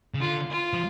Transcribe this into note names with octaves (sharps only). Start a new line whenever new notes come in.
C#3
D3 F4
F4
F3